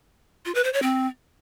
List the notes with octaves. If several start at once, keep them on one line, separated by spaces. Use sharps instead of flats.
F4
B4
C5
C#5
C4